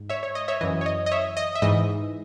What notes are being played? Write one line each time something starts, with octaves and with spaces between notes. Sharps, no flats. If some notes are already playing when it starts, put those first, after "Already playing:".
Already playing: G#2
C#5 E5
C#5
D#5
C#5 E5
F#2 E3 D#5
C#5
D#5
D#5
C#5 E5
D#5
E5
G#2 E3 D#5